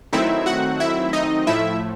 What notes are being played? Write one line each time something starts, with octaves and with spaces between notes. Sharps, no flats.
D#3 F#3 A3 C4 D#4 E4 E5
F#4 F#5
E4 E5
D#4 D#5
A2 F3 A3 E4 E5